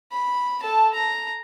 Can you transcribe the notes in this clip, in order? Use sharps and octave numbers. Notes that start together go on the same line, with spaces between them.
B5
A4 A5
A#5